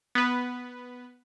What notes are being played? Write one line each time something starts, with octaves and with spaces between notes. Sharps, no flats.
B3 B4